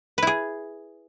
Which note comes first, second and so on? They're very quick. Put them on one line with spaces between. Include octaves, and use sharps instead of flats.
B4 E4 G#4